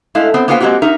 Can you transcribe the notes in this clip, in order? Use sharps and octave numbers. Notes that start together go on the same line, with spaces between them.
G#3 A3 E4 F5
B3 C4
A#3 B3 F4 C5 F5 G5
G#3 A#3 C4 F#4 G4
D#4 A#4 E5